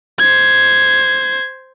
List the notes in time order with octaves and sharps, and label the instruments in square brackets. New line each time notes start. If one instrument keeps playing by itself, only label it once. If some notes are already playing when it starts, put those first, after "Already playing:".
[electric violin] C5 G#6